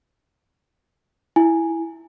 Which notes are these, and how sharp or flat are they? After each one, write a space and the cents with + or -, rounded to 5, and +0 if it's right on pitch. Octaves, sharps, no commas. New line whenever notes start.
E4 +0 G#5 +0